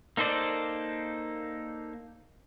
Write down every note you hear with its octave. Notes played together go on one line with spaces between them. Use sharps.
A#3 D#4 A4 C5 D5